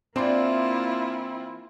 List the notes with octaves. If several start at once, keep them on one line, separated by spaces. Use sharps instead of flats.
E3 A#3 C4 D4 E4 F4 C6